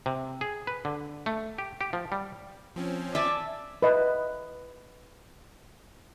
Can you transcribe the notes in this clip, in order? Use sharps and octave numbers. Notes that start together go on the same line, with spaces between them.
C3
G#4
B4
D3
A3
G4
G4
F3
G3
F3 C4 C#4
D5 E5 G#5 A5
B4 D#5